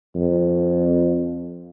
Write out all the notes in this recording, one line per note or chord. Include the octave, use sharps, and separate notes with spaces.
F2